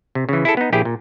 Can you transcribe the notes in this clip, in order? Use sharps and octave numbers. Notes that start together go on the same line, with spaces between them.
C3
C#3 E3
E4 G#4 A4
B3 D#4
A#1 E4 G4 G#4 G5
A#2